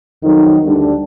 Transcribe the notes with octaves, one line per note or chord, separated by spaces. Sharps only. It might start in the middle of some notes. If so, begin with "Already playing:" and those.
F2 D#3 F#3 D#4
D2 D3 G3 D4